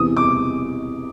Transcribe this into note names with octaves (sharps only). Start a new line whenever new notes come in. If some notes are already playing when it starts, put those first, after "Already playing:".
Already playing: E2 C3 E3 D#6
D6